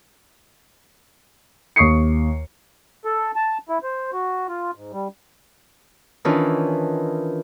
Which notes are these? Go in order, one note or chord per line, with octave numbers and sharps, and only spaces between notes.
D#2 C#6 D#6 C7 C#7
A4
A5
E4
C5
F#4
F4
G#2
G3
D#3 E3 C#4 D4 F4